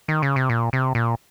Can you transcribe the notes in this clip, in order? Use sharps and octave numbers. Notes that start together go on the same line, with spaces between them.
D#3
C#3
C3
A#2
C3
A#2